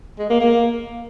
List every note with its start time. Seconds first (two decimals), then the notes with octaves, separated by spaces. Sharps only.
0.19 G#3
0.30 A#3
0.41 A#3